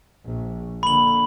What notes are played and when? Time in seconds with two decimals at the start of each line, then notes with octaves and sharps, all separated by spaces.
0.25 A#1
0.83 D3 A#3 B5 F#7